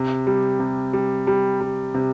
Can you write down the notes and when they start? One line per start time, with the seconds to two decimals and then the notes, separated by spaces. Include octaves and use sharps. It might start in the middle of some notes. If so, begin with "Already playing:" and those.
Already playing: C3
0.27 G3
0.60 C3
0.93 G3
1.27 G3
1.61 G3
1.94 C3